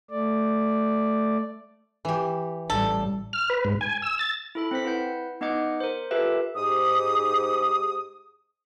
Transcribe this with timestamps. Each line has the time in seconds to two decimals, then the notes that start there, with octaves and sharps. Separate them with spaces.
0.10 A3 D5
2.05 E3 G4
2.70 A1 G3 A4
3.33 F6
3.50 B4
3.65 G#2
3.81 G#5
4.02 E6
4.19 A6
4.55 E4 A4 B5
4.71 C4 C5 B6
4.85 E4 B4 F#5 G6
5.41 B3 D#4 D#5 F#5 D6 G6
5.80 A#4 C5
6.11 F4 G4 A4 B4 E5
6.56 G#2 G4 D#6